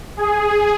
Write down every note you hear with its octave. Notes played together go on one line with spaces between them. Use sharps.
G#4